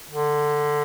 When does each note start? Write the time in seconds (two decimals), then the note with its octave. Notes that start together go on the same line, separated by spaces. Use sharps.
0.11 D3